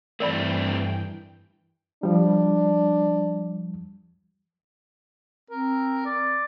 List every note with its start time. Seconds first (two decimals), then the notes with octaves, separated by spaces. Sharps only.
0.20 G2 E3 A3 C4 A#4 D5 G5 B5
2.03 F3 G3 D4
5.50 C4 A#4
6.05 D5